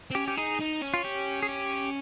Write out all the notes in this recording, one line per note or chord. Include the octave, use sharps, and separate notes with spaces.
C4
C#4 G4
G4
D#4 G#4
D#4
C#4
F4
G4
G#4
G4